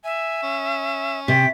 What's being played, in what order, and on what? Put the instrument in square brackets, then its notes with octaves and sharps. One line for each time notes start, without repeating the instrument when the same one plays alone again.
[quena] E5 [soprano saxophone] G#5
[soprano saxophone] C#4
[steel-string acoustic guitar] C3 [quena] G5 [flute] B6